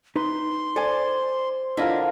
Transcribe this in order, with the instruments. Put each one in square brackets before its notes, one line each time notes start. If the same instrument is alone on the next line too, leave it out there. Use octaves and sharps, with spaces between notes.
[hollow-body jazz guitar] D#4 B4 [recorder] C6
[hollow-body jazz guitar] A4 G#5 [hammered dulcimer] C5 [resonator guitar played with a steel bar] D5
[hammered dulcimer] D3 F4 A#4 [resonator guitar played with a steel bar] D4 E4 D#5